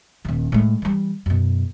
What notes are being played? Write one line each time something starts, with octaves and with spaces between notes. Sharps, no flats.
D#1 D#3
A2 G#3
E3 G3
F#2 B2